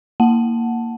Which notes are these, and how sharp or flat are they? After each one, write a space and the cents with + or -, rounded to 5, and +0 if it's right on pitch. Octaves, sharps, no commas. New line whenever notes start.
A#3 -10 F#5 +0 A5 -5